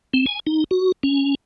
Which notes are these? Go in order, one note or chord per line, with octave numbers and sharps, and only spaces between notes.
C4
G#5
D#4
F#4
C#4